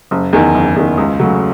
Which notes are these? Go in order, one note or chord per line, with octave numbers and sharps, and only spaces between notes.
F#1
E2 D#3
F#1
E2 D#3
C#2
C#3 F#3 A3